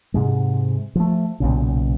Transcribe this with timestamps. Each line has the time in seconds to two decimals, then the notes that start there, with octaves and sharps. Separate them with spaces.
0.14 G#2 C3 G#3
0.95 F3 A3
1.40 B1 A#2 C#3